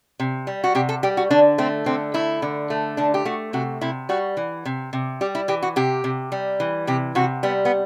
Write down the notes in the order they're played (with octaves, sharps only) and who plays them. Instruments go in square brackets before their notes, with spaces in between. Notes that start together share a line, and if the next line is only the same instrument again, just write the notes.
[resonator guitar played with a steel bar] C3
G3
F#4
C3 G4
A4
G3 G4
F#4
D3 D4
A3 C4
D3 C4
A3 E4
D3
A3
D3 D4
G4
A3 F#4
C3 F#4
C3 E4
G3 F#4
E3
C3
C3
G3 G4
E4
E3 G4
F#4
C3 G4
C3
G3
E3
C3 G4
C3 F#4
G3 B3
B3